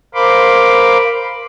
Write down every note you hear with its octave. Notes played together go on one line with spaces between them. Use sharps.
A#4 C5 F5 B5 C6 D6